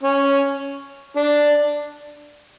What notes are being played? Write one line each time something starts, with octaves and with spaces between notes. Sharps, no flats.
C#4
D4